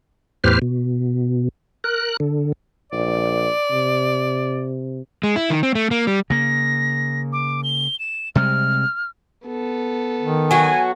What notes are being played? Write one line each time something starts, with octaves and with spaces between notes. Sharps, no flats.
E2 A2 G4 B4 C5 F6
B2
A#4 F#6
D3
A#1 D5
C3
G#3
E4
D#3
C4
A3
A#3
G3
C#3 A#3 A#6
D6
G7
E7
C3 G3 G#3 F6
B3 A4
D#3
F#3 F#4 G#5